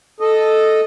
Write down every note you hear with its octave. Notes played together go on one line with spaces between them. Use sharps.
A4 D#5